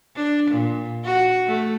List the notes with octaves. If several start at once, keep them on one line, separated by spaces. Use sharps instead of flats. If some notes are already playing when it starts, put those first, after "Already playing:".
D4
A#2
F#4
A3